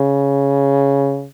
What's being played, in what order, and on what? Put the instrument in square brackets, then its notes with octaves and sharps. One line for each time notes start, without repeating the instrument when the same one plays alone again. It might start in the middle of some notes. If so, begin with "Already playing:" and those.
Already playing: [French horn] C#3